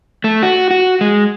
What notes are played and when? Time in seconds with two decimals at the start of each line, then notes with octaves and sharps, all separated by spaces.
0.24 A3
0.43 F#4
0.71 F#4
1.01 G#3